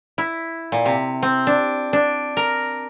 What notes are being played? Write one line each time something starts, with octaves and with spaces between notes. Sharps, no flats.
E4
A#2
C3
C4
D4
D4
A#4